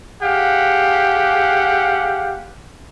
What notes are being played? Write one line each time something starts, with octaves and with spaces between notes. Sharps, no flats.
G4 G#4 F5 F#5